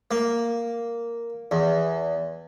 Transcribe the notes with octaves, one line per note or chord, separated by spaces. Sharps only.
A#3
E2